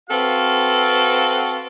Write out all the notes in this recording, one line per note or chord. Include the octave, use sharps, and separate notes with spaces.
C4 F#4 A4 B4 F5